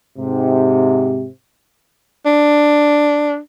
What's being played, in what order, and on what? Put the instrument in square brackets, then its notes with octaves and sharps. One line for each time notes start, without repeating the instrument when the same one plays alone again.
[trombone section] G#2 C3
[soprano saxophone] D4